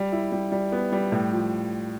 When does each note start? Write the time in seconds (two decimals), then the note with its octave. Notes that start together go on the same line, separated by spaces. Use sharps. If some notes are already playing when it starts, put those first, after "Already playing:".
Already playing: G3
0.12 E4
0.32 G3
0.52 G3
0.72 B3
0.92 G3
1.12 A2
1.32 F3